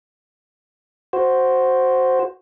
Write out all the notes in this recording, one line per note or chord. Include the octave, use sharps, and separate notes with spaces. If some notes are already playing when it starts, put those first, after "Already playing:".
F#4 C5